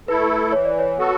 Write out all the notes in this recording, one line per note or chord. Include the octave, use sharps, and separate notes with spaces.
A3 E4 A4 B4
E3 C#5
D5
C#5
B3 F#4 A4